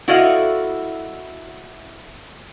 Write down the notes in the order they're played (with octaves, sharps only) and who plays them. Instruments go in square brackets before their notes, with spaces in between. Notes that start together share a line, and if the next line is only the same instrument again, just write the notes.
[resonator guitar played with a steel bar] E4 F#4 A4 D5 D#5 F5